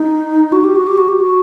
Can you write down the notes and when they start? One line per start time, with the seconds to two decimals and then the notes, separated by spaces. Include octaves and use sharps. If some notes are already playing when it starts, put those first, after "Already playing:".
Already playing: D#4
0.52 F#4
0.64 G4
0.76 F#4
0.87 G4
0.98 F#4
1.08 G4
1.20 F#4